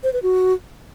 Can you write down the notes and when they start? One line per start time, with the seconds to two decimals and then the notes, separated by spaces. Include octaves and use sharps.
0.03 C5
0.13 B4
0.23 F#4